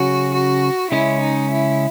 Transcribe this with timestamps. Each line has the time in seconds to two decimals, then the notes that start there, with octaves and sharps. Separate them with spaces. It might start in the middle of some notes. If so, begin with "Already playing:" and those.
Already playing: C#3 F#3 C#4 F#4
0.34 F#4
0.91 C#3 G#3 C#4 E4
1.20 D#4
1.51 E4